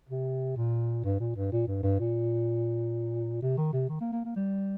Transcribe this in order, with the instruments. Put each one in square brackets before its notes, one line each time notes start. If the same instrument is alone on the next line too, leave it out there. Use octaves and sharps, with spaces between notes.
[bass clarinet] C3
A#2
G2
A#2
G2
A#2
G2
G2
A#2
C3
D#3
C3
D#3
A#3
A#3
A#3
G3